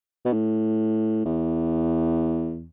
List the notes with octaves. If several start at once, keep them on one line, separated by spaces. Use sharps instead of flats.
B2
A2
E2